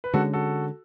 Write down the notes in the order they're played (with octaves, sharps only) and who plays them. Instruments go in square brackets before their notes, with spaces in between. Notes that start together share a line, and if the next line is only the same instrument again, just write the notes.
[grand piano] B4
[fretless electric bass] D3 G#3 C#4 [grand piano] F#4 A4
[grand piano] F#4 A4